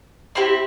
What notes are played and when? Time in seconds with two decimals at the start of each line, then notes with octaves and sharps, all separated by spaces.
0.35 C4 E4 G4